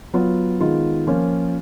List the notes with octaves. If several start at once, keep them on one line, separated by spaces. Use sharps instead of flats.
F#3 B3 F4
D#3 G#3 B3 F4
F3 A#3 C#4 F4